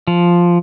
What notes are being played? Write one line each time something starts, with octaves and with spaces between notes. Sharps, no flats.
F3